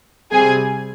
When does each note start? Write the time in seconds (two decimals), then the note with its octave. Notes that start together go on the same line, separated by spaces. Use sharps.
0.32 C3 G3 C4 G#4 G#5